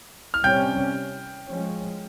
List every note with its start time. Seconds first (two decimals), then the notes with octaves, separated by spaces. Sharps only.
0.34 F6
0.44 C3 G3 C#4 G5 G6
1.49 F3 G#3 C#4